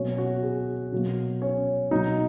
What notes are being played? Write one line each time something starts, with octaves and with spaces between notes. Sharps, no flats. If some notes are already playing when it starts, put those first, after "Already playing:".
Already playing: B2 F#3 A#3 C#4 C#5
F#4
G#4
B2 F#3 A#3
C#4 C#5
B2 F#3 A#3 D#4 D#5